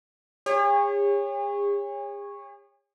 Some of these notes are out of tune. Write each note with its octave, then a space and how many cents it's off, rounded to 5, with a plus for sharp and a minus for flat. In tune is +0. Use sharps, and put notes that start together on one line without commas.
G#4 -45 C#5 -10